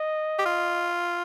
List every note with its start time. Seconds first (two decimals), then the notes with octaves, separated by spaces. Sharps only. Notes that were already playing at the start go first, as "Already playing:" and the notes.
Already playing: D#5
0.39 G4
0.46 F4